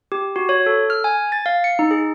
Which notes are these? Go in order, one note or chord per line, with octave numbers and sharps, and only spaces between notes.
G4
F#4
C#5
A4
F6
G#5
A6
F5
C#7
D#4
G#4